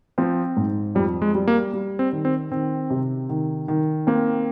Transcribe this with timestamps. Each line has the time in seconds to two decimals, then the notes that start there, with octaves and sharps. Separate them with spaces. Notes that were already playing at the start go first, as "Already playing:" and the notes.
0.18 F3 C4
0.57 G#2
0.95 F2 G3
1.22 G#3
1.35 G3
1.48 A#3
1.73 G3
1.99 C4
2.12 D#3
2.25 C4
2.51 D#3 C4
2.90 C3
3.29 D#3
3.68 D#3
4.07 A#3 C4